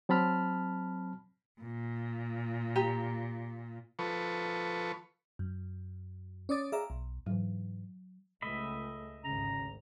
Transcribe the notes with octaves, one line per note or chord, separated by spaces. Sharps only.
F#3 C4 A5 B5 F6
A#2
G4 A#5
F3 A4 B4 C#6
F#2
C#4 C#5 D5 D6 D#6 A6
G#4 D5 E5 F5 A#5
B1
G#2 E3 F#3
C#2 A3 D#5 E5 B5
G#1 D2 C#3 A#5